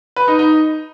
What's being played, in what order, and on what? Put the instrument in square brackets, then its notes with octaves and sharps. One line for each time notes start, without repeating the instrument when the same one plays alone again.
[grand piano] B4
D#4
D#4